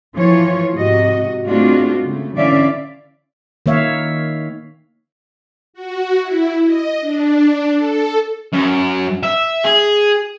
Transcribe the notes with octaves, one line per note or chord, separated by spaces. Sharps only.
E3 F3 F4 C#5
G#2 C3 F#4 D#5
G#3 A3 C4 D4 F4 F#4
C#3 A3
D3 E3 C#4 D5 E5 F5
D#3 A#3 C#5 E5 F5
F#4
E4
D#5
D4
A4
F#2
E5
G#4